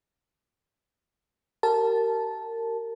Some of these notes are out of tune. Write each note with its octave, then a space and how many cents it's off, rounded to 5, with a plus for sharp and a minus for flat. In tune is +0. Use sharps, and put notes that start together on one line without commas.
G4 -35 A#4 -25 A5 -10